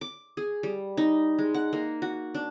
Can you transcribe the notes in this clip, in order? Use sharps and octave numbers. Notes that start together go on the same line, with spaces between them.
D6
G#4
G3
D#4
G#3
F#5
A#3
F#4
D4